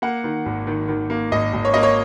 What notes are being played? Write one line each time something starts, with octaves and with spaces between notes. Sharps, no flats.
A#3 F#5
D#3
G#1
D#3
D#3
A#3
G#1 D#5
G#1
C#5
A#3 D#5
C#5